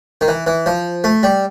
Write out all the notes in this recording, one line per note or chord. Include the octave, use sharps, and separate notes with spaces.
D#3
E3
E3
F3
A3
G3